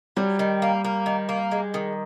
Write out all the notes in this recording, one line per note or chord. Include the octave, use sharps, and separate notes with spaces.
F#3 G3
D#3
A#3
A#3
D#3
A#3
G#3
D#3